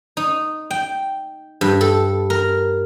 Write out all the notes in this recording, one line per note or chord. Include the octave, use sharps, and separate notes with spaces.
D#4
G5
G2
A4
A#4